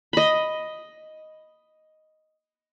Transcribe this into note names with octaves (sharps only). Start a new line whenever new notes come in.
D#5 B5